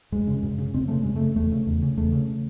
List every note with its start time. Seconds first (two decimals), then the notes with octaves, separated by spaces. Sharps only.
0.12 F#2 G#3
0.27 C#3
0.43 F#2
0.58 C#3
0.74 F#2 C4
0.88 C#3 A3
1.02 F#2 G#3
1.16 C#3 A3
1.36 E2 A3
1.51 C#3
1.67 E2
1.82 C#3
1.97 E2 A3
2.12 C#3